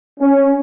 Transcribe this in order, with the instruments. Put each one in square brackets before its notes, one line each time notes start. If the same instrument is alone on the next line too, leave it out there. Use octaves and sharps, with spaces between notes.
[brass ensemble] C#4